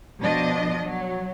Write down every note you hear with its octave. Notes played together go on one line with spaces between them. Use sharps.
B2 F3 D4 D#5
F#3